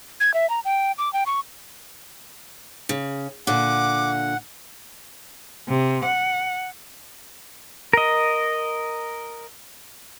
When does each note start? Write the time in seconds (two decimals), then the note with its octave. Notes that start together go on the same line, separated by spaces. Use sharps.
0.20 G#6
0.34 E5
0.50 A#5
0.65 G5
0.98 D6
1.13 G5
1.26 C#6
2.89 C#3
3.47 A#2 D3 F#5 D6
5.69 C3
6.05 F#5
7.93 A#4 D#5